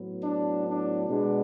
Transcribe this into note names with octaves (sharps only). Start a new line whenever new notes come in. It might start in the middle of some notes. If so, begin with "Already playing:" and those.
Already playing: A2 F#3 B3
D4
D4
B2 G#3 B3 D4